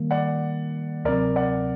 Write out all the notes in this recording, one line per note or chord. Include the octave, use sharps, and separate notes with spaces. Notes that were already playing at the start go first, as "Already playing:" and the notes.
Already playing: D#3 G3 A#3
D5 F#5
D2 C3 F#3 C4 A#4 D5
D5 F#5